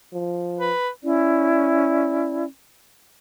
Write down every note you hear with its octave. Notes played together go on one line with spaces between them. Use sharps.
F3
B4
C#4 E4 D5